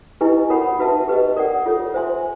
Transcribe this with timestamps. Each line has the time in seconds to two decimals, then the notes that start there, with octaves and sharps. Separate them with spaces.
0.21 E4 G4 B4 D#5 G#5
0.50 F#4 A#4 C#5 F#5 B5
0.79 D#4 F#4 B4 E5 A5
1.08 G4 B4 D#5
1.36 A#4 D5 F#5
1.66 F4 A4 C#5
1.94 C5 E5 G#5 C6